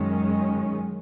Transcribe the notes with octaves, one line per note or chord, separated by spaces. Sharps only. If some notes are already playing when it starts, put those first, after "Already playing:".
Already playing: F#2 D#3 G#3 C#4